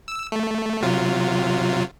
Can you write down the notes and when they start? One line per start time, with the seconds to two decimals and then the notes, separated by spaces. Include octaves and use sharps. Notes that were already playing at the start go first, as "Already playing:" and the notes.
0.08 E6
0.32 A3
0.82 C3 F#3 F4